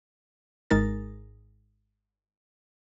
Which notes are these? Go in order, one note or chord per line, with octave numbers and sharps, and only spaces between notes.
G#1 G#2 G#3 D#4 A#4 A6